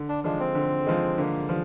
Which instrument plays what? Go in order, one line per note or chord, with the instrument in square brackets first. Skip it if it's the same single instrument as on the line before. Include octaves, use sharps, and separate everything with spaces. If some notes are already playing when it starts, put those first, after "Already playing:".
Already playing: [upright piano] D3
[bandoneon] D4
[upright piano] F3 G#3 [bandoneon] D4
[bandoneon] C4
[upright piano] D3
F3 G#3
[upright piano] D3 [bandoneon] A#3
[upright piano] F3 [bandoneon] G3